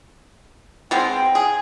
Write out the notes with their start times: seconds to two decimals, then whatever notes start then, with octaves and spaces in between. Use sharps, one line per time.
0.91 B2 G#3 C4 G5
1.35 G#4